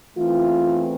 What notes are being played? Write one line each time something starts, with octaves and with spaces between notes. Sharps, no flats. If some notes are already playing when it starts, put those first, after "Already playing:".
E2 E3 A3 C4 F4